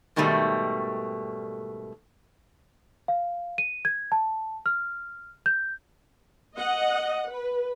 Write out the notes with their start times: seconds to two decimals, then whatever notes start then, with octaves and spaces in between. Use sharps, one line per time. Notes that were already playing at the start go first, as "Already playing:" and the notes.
0.16 G#2 B2 D#3 G3 A3
3.08 F5
3.58 D#7
3.85 G#6
4.12 A5
4.66 F6
5.46 G6
6.56 D#5 F#5
7.29 B4